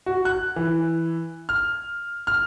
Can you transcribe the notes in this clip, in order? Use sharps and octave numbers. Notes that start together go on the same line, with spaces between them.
F#4
F#6
E3
F6
F6